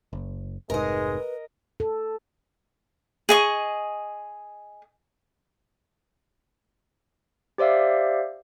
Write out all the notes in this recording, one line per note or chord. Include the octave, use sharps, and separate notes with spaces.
F#1
F1 G#2 G#3 A#4 B4 D#5
A4
G#4 D#5 C#6
G4 C5 D5 E5 F5